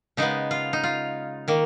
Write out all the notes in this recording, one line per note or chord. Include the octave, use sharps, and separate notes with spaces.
C#3 G#3 B3 D#4
F4
D#4
F4
D#3 A#3